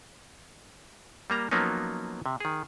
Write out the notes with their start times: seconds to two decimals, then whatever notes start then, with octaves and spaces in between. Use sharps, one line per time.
1.30 G3 A#3 A#5
1.51 F3 F#3 A#3 B3 C#4 D#4
2.26 C3
2.40 D#3 G#4